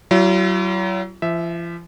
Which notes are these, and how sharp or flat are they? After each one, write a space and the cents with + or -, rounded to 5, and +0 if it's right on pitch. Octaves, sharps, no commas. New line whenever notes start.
F#3 +35 F4 -45
F3 -40 E5 -5